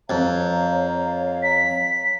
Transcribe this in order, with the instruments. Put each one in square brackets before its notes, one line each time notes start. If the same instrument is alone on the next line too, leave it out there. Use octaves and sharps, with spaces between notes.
[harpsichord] F2 [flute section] C#5 F5 A#5
[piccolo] B6